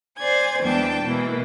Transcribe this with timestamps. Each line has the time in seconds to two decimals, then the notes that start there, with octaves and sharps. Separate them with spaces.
0.18 C5 D5 G#5 G#6
0.63 E2 G#3 D4 G5 A5
1.03 B2 E3 G#3 A#3